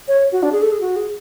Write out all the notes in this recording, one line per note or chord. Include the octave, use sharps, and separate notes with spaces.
C#5
F#4
D4
G#4
A4
G#4
F#4
G#4